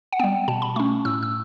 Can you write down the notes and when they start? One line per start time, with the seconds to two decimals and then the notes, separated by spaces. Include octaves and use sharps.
0.13 F#5
0.19 G3 B3 G5
0.48 B2 A5
0.62 B5
0.76 A3 C#4 C#6
1.05 A2 E6
1.23 E6